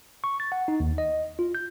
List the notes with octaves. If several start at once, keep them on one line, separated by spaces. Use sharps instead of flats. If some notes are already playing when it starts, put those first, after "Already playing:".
C#6
A6
F#5
D#4
D#2
D#5
F4
G6